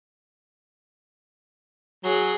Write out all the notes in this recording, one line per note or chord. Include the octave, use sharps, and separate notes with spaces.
F#3 G#4